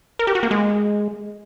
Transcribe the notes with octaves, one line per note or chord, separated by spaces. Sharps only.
A#4
G4
F#4
A#3
G#3